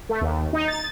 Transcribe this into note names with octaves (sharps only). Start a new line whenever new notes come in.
A3
D#2
D#4
A6